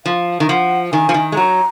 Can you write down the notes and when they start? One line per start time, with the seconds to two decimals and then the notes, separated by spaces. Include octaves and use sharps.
0.05 F3 F5
0.40 D#3
0.49 F3 F#5
0.93 D#3 G#5
1.09 F3
1.14 D#3
1.32 G#3
1.36 F#3 A#5